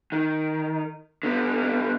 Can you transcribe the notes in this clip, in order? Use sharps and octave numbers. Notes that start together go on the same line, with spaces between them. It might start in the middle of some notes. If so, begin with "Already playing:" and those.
D#3
D3 B3